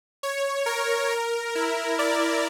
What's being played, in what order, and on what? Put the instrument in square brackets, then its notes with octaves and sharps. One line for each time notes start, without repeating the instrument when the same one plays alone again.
[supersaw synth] C#5
A#4
A#4
E4
D5